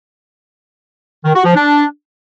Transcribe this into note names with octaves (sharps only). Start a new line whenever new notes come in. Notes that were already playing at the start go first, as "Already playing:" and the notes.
D#3
F#4
F3
D4